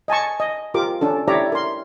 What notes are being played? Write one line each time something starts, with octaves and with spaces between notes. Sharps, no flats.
D#5 G#5 A5 C#6
D#5
F4 G4 A#4 D6
C#4 D4 A4
E4 G4 C#5 D5 E5 A#5
A#4 C6